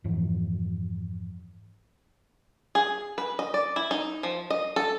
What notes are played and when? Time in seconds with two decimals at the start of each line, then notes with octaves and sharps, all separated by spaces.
0.04 F2 G#2 E3 F3
2.75 G#4
3.18 B4
3.39 D#5
3.54 D5
3.76 E4
3.91 D#4
4.23 F3
4.50 D#5
4.76 A4